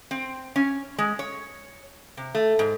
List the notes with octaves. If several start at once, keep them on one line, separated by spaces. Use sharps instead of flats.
C4
C#4
G#3
C#5
C3
A3
G#2